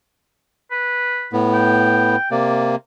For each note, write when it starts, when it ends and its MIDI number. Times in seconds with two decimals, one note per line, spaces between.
0.70 1.32 71
1.33 2.16 45
1.33 2.16 59
1.54 2.31 79
2.31 2.76 48
2.31 2.76 58
2.31 2.70 74